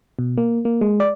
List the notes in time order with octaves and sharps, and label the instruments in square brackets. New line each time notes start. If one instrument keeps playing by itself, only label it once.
[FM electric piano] B2
A#3
A#3
G#3
D5